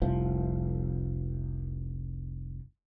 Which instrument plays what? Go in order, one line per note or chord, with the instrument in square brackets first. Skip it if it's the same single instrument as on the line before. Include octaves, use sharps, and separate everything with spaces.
[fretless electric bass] F1 C2 F3